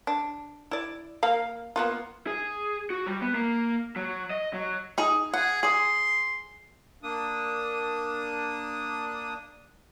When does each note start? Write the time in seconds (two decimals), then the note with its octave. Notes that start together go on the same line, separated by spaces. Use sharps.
0.07 D4
0.71 E4 D5
1.23 A#3 F5
1.76 A#3 B3 F4
2.27 G#4
2.90 F#4
3.06 G3
3.21 B3
3.35 A#3
3.96 F#3
4.30 D#5
4.54 F#3
4.98 D#4 G#4
5.34 G#4 F#5
5.63 G#4 D5 C6
7.03 A#3 D4 D#6